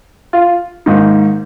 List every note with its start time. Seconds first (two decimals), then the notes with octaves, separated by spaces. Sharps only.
0.33 F4
0.86 G#2 D#3 A#3 D#4